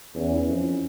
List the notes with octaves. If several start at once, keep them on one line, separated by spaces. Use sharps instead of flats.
E2 C#4
E4
F2 C#4
E3